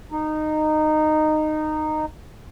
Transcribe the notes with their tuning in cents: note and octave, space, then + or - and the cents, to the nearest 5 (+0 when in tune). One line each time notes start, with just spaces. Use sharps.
D#4 -15